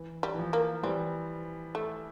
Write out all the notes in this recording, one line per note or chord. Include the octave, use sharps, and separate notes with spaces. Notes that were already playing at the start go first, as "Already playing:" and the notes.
Already playing: E3
G3
E3
F3
A#3
E3 G3 C4
A3